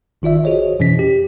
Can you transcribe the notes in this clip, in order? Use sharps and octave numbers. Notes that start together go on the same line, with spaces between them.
G#1 D#3 F4 D5 E5
F#4 G#4 C5 C#5 D#5
F2 B2 E3 C#4 B6
G4